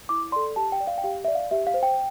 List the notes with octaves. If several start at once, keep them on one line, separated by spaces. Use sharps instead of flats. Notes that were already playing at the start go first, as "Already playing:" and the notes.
E4 D6
A4 D5 C6
G4 A5
G5
D5
F5
G5
G4 F5
D5 E5
F5
G4 E5
F5
C5
G5